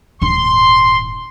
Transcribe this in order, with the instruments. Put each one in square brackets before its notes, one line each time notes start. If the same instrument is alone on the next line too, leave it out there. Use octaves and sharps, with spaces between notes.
[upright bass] D#1 G#2 [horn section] C6